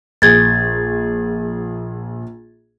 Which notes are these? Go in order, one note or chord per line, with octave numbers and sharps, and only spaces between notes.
A#1 G#4 G#6 A6